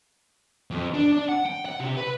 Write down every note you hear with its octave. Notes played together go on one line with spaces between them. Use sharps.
F2
D4
D4
F#5
G5
F#5
C3
B4